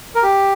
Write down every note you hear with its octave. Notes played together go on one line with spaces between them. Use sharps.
A#4
G4